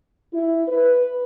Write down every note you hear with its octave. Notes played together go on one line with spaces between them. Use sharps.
E4
B4